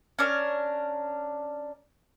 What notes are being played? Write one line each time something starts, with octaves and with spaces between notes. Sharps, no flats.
C#4 D4 A#4